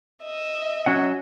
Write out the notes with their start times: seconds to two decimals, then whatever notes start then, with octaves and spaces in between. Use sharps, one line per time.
0.23 D#5 E5
0.86 F#3 C#4 F#5